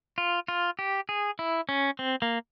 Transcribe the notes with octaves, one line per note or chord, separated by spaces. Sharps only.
F4
F4
G4
G#4
E4
C#4
C4
A#3